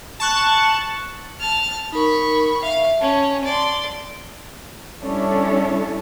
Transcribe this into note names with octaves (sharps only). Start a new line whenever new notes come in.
A5 C#6 F#6
A5 F6
D#4 A#4 B5 C#6
E5 F5
C#4 A5
D5 C6
G3 C#4 D4 E4 A4 C#5